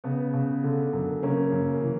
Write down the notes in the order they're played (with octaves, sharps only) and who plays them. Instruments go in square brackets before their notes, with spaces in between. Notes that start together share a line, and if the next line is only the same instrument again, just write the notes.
[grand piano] C#3 B3
C#3
D3
F#2
C#3 A#3 C#4
F#2
E3